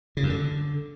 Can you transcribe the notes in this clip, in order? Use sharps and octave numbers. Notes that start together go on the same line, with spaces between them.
C#3
F#2
D3